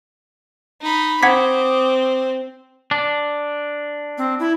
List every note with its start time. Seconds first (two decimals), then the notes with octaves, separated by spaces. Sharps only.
0.81 D#4 B5
1.23 C4 F#5 D6 D#6 G#6 B6
2.91 D4
4.18 C4
4.40 E4